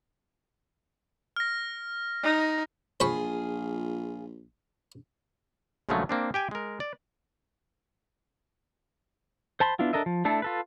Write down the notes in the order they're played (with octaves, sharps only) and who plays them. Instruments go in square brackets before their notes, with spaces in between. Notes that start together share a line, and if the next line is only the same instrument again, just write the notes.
[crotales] F6 A#6
[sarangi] D#4
[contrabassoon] A#1 [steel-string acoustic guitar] F4 G#4 [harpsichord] C5 B5 C#6
[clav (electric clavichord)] A#1 C#3 F3 F#3 G#3 A3
A#3 C4 D4
G4 G5 G#5
G#3 A#4
D5
[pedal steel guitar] C5 A5 B5 C6
B3 D4 E4 F4
D4 A4 A#4 D#5 E5
F3
A3 D4 E4 A4
F4 A4 B4